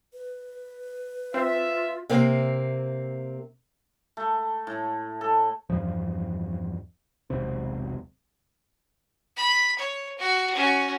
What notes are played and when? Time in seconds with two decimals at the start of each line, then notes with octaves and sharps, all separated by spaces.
0.13 B4
1.34 C4 F4 E5
2.09 C3 A#3 C4
4.17 A3
4.67 A2
5.21 A4
5.70 E2 G2 F3
7.30 E1 B1 C3 C4
9.37 B5
9.79 C#5
10.18 F#4
10.55 C#4 F#4